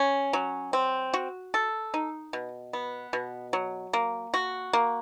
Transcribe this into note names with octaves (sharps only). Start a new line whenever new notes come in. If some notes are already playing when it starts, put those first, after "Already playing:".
Already playing: C#4
F#3
C4
F#4
A4
D#4
B2
B3
B2
F#3
A#3
F#4
A#3